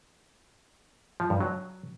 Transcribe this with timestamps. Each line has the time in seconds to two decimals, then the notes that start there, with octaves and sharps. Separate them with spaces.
1.20 F3
1.30 G2
1.41 F#3